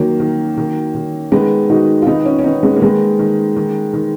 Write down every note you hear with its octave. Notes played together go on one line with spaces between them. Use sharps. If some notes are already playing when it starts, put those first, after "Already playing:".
Already playing: D#3 F#3 A#3
D#3
D#3
D#3
D#3 G#3 B3
D#3 D#4 F#4
F4
D#3 B3 D#4
C#4 F4
C#4
D#3 B3 D#4
G#3 B3
A#3
D#3 G#3 B3
D#3
D#3
D#3